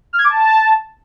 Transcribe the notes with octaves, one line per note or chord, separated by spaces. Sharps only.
F6
G#6
D6
A5